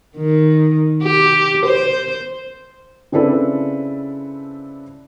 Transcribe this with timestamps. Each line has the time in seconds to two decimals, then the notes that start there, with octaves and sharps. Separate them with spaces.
0.16 D#3
1.03 G4
1.66 C5
3.12 C#3 C4 D4 E4 A4 B4